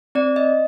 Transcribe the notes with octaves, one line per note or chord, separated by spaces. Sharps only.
C4 D5
D#5